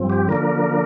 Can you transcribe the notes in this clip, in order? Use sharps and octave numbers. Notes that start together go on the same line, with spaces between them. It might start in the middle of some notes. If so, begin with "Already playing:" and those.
Already playing: G2 F3 C4
G4
D3 F3 A#3 D4 A#4